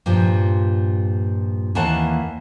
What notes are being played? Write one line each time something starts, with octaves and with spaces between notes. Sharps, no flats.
G2 A#2 F3
D#2 E3 A#3 F#5 A5